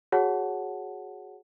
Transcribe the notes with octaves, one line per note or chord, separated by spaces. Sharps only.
F#4 G#4 C#5 F#5 A5